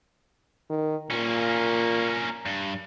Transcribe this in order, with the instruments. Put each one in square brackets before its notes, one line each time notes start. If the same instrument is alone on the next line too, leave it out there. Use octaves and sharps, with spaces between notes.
[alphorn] D#3
[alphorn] A#2 [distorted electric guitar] A#3 C#4
[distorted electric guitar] G2